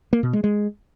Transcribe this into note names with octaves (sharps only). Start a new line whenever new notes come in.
A#3
B2
G#3
G#3